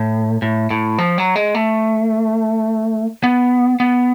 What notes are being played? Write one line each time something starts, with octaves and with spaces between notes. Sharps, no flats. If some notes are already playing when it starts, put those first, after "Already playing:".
Already playing: A2
A2
A2
F3
F#3
G#3
A3
B3
B3